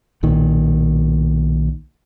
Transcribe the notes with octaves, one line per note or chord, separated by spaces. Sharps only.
B1 A#2 D#3